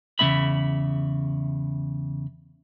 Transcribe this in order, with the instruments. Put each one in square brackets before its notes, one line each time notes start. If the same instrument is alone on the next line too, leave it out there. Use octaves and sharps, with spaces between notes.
[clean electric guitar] E2 C#3 G#3 C4 E5 B5